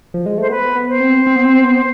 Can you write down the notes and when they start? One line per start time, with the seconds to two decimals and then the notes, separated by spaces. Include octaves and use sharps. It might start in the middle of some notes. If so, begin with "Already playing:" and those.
0.14 F3
0.26 G#3
0.38 A3 C5
0.49 B3 B4
0.75 B3
0.88 C5
1.00 C4
1.27 C4
1.36 B3
1.45 C4
1.64 B3